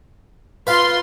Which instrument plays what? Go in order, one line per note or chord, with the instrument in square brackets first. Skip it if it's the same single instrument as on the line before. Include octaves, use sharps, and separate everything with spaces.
[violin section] F4 C6 [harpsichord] B4 F5